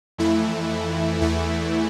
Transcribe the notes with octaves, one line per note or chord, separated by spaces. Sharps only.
F2 E3 A3 E4
E2 E3 A3 E4